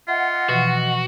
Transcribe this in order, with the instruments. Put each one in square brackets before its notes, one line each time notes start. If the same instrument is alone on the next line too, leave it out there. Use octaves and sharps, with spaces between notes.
[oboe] F4 [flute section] D#5 F#5 [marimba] E5
[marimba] B2 E3 F3 [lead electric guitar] F#4